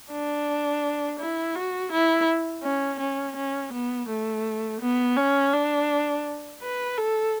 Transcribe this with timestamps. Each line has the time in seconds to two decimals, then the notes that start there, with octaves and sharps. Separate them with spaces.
0.11 D4
1.19 E4
1.55 F#4
1.92 E4
2.64 C#4
3.00 C#4
3.36 C#4
3.72 B3
4.09 A3
4.81 B3
5.17 C#4
5.53 D4
6.62 B4
6.98 A4